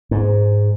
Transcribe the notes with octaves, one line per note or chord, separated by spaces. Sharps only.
G#2